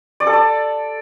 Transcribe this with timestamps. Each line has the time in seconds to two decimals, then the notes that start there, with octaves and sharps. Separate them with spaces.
0.20 D5
0.27 A4
0.33 D5